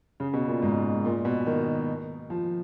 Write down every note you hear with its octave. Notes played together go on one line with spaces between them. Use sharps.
C#3
B2
A#2
G#2
A#2
B2
D#3
F3